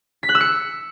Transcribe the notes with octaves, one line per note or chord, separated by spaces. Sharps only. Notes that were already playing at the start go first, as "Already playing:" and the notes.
B6
F#6
E6
C#7